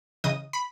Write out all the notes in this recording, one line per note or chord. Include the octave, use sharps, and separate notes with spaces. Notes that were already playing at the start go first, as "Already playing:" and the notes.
C#3 E3 D#5 D#6
B5